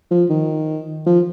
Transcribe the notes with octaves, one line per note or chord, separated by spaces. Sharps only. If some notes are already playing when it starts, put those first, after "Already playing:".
F3
D#3
F3